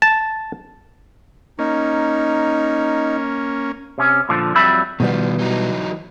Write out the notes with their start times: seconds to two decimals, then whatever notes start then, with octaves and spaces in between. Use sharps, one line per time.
0.02 A5
1.59 A#3 C#4 D#4
3.98 C3 C#4
4.29 A#2 D3 F3
4.55 F2 F#3 G3 E5 B5
5.00 B2 D#3 F3 G3 B3
5.38 E3 F#3 D#4